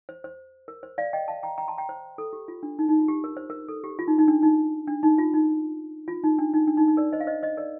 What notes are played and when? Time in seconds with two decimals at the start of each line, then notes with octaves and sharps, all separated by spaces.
0.09 C5
0.24 C5
0.68 A#4
0.83 C5
0.98 D5 F5
1.13 D#5 G5
1.28 F5 A5
1.43 G5 A#5
1.58 G5 A#5
1.68 A5 C6
1.78 G5 A#5
1.89 C5
2.18 A4
2.33 G4
2.48 F4
2.63 D4
2.79 D#4
2.89 D#4
2.99 F4
3.08 G4
3.24 A#4
3.37 C5
3.50 A#4
3.68 A4
3.84 G4
3.99 F4
4.08 D#4
4.19 D#4
4.28 D4
4.43 D#4
4.87 D4
5.03 D#4
5.18 F4
5.34 D#4
6.08 F4
6.23 D#4
6.38 D4
6.53 D#4
6.67 D4
6.77 D#4
6.88 D#4
6.97 A#4 D5
7.12 C5 D#5
7.20 F5
7.27 C5 D#5
7.43 C5 D#5
7.57 A#4 D5